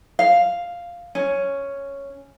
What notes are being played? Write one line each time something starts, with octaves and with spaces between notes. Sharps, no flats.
F5
C#4